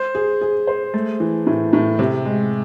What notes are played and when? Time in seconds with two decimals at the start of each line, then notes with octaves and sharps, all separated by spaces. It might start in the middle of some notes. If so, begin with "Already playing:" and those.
Already playing: C5
0.15 G#4
0.41 G#4
0.67 C5
0.94 A3
1.20 E3
1.47 A2
1.73 A2
1.99 C3
2.25 G#3